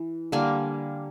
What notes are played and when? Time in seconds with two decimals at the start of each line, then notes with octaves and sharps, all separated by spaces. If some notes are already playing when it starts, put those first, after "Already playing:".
Already playing: E3
0.32 D3 G3 A#3 G#5